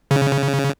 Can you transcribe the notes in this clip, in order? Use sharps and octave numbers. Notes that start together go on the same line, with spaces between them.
C#3